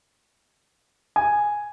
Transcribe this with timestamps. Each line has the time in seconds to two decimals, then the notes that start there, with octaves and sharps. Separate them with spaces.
1.16 G#5